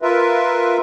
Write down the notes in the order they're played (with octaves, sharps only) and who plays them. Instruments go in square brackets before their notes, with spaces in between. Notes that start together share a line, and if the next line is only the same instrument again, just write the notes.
[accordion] F4 A#4 B4 E5